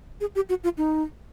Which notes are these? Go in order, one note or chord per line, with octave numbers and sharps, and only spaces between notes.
G#4
G4
F#4
F4
D#4